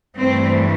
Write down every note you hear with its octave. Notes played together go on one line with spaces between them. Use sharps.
G2 E3 A3 C4